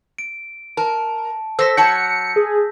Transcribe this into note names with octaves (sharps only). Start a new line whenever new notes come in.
D7
A#4 A5
A4 C5 E6 A#6 B6
F#3 C#5 A5 G6 C#7
G#4